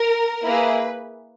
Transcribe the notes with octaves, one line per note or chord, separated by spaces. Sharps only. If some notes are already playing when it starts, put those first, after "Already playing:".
Already playing: A#4
A#3 E4 G#4 B4